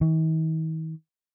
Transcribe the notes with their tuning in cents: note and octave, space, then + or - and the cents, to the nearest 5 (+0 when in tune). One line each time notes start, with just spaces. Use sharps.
D#3 +45